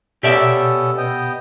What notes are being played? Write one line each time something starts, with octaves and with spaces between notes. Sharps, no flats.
B2 B3 C#4 G4 A4 D5 E5
B3 D#5 G5